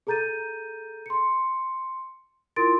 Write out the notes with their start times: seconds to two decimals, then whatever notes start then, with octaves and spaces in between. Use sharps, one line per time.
0.07 G#4 A4 A#5 G6 A6 D#7
1.06 C6 C#7
2.56 E4 F4 A#4 C6 A6 D7